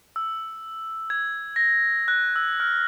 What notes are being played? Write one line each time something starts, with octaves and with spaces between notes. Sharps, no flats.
E6
G#6
A#6
F#6
E6
F6